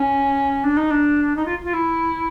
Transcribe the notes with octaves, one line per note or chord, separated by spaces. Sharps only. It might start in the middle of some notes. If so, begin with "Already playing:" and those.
Already playing: C#4
D4
D#4
D4
D#4
F4
F4
E4